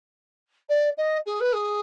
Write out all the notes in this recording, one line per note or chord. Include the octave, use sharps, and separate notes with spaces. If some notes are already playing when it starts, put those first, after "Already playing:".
D5
D#5
G#4
B4
G#4